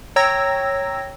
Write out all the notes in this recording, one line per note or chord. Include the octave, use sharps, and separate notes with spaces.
C#5 G5 A#5 E6 G#6 A#6